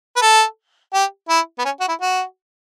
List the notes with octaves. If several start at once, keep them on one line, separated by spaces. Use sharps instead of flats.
B4
A4
G4
E4
B3
C#4
F#4
E4
F#4